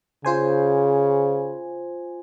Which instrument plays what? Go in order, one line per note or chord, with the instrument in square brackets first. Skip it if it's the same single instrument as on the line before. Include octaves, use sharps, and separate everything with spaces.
[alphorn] C#3 [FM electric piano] F4 C5 G#5